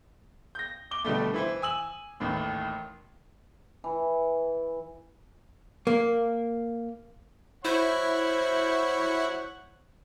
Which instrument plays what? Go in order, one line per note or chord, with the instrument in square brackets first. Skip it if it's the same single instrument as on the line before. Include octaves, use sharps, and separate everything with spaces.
[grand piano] G6 A#6
D6 G7
B2 D3 G3 A3
E3 E4 C5
G#5 E6 F#7
A1 D#2 A2
[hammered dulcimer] E3
[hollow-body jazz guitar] A#3
[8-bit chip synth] E4 [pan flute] C5 [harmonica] C#5 F#5 C#6